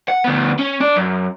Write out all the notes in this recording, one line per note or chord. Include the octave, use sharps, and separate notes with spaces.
F#5
D2 B3
C#4
D4 D5
F#2